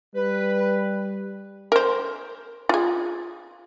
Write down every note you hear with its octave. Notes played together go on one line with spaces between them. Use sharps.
G3 B4
A#4 C5
F4 G#4